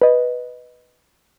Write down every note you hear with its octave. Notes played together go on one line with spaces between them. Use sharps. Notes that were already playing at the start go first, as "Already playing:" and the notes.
B4 D#5